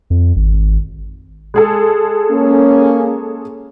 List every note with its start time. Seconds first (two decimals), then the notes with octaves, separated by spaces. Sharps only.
0.10 F2
0.36 G#1
1.54 G#3 G#4 A4
2.31 A#3 C#4